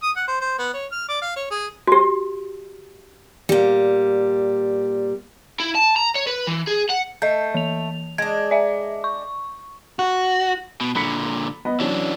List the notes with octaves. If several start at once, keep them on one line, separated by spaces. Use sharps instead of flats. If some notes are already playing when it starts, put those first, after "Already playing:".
D#6
F#5
C5
C5
B3
C#5
F6
D5
F5
C#5
G#4
F#4 G4
A#2 G3
E4
A5
A#5
C#5
B4
E3
G#4
F#5
A3 D#5 G6
E3 F7
G#3 D4 G#6
D5 E5
C#6
F#4
B2
A#2 D3 B5 B6 C#7
B3 D#5 B5
E3 F#3 C#4 D4